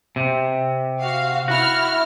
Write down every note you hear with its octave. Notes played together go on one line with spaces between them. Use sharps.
C3
F#4 F5
E4 F#4 F6